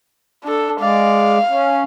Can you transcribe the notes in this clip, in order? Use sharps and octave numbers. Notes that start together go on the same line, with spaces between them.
D4 A4
G#3 D5 F5
C#4